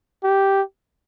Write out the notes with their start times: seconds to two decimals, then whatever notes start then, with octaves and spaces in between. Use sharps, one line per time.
0.24 G4